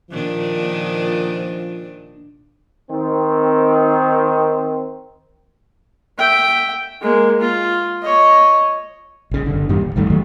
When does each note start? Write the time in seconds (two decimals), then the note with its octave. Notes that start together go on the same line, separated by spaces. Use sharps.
0.11 A#2 D#3 F3 D4
2.90 D#3 C4
6.18 E5 G5
7.01 G#3 A#3
7.41 F4
8.02 C#5 D#5
9.31 A#1 C#3
9.46 F#1 D3
9.69 F#2 A#2 D#3 G3
9.81 D1
9.96 B1 G2 D#3 A3
10.10 E2 D#3 F#3 A3